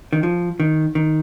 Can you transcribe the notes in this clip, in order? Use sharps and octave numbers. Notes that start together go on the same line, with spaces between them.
D#3
F3
D#3
D#3